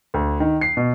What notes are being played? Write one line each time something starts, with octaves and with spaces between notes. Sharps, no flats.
D2
D#3
C7
B2